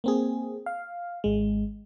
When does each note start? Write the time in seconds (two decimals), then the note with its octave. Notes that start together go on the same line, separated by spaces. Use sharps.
0.04 A#3 C4 G#4
0.66 F5
1.24 G#1 G#3